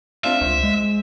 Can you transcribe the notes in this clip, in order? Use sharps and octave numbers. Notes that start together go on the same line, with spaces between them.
C4 D4 F4 E5
C#2 C5
G#3